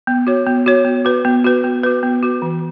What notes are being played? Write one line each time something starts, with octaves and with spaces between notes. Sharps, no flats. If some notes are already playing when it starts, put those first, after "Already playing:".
B3
F#4 C#5
B3
F#4 C#5
B3
F#4 B4
B3
F#4 B4
B3
F#4 B4
B3
F#4 B4
E3